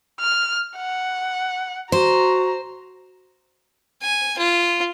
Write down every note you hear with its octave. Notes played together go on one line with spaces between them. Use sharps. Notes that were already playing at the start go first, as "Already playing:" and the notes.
F6
F#5
F#4 C5 A#5
G#5
F4